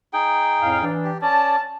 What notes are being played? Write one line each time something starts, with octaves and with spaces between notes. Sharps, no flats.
D#4 G#4 G5
F2 A2 F5
E3 D4
G4
C#4 D5 A5